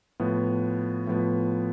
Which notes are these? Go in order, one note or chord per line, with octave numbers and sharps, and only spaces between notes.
A2 F3 B3
A2 F3 B3